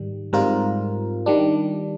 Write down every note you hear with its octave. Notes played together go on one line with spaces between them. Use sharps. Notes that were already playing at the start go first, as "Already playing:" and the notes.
Already playing: G#2 D#3 G3
G#2 G3 C4 F4 A#4
D#3 G3 D4